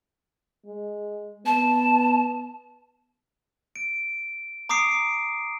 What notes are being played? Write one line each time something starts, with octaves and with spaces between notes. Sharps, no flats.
G#3
B3 A5
D7
A#5 D6 D#6 C7 D7